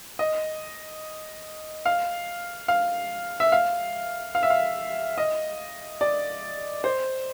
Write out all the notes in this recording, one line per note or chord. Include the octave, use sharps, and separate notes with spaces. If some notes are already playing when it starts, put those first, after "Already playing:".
D#5
F5
F5
E5
F5
F5
E5
F5
D#5
D5
C5